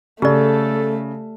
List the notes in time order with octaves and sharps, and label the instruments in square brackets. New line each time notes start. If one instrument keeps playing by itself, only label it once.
[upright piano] C#3 [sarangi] A3 [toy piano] G4 D5 [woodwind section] A4